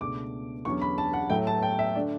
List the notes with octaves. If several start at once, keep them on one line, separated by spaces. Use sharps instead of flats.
C#2 B2 A3 D4 D6
E2 D3 F#3 C#4 C#6
B5
A5
F#5
A2 F#3 A3 G5
A5
G5
E5
D3 A3 D4 D5